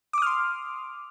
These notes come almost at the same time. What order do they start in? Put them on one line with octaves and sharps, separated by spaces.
D6 D#6 F6 C6